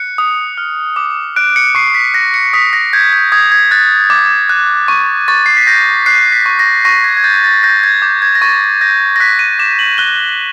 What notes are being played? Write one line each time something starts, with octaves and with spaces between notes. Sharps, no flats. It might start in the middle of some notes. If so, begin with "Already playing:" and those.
Already playing: F#6 C#7
D#6
F6
D6
F#6 D7
C#7
C#6 C7
B6
F#6 A#6
C#7
D#6 B6
A#6
G6 G#6
G6
D#6 G#6
G#6
F#6 A6
D6
F#6
C#6
C#6 A6
C7
B6
G6 A#6
F#6 C7
B6
C#6
A#6
C#6 A#6
G#6
G#6
G6 A6
A6
G6 A#6
G#6
D6 G6
G#6
A#6
C#6 A6
G6 A#6
A#6
F#6 B6
D#7
D6 E7
F#7
F#6 G7